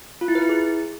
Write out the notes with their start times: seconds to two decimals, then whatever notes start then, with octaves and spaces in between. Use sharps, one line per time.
0.21 F4
0.28 E4
0.35 B4
0.42 E4
0.49 G#4